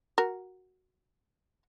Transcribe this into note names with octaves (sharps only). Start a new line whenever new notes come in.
F#4 A#4